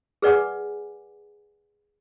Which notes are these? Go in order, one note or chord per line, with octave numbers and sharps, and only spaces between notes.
G#4 B4 D5 F#5 G#5 D6